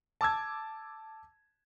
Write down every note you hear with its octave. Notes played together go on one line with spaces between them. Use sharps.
A5 D6 E6 G#6